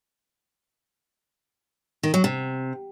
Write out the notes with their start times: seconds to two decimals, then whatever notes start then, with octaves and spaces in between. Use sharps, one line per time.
2.03 D#3
2.14 F#3
2.24 C3